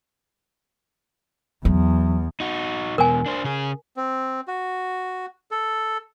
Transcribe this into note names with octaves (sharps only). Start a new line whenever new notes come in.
E2 F#3
D#4 F#4
E2 B2 A#4 G#5
D4 C5
C#3 G#4
C4
F#4
A4